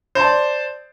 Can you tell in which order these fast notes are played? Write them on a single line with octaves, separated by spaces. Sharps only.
C5 A5 D5